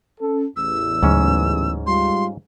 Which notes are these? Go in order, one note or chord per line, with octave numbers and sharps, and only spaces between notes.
C#4 A4
A1 E2 E6
D2 G#2 C#3 F#3 C#4
G3 G#3 F4 C6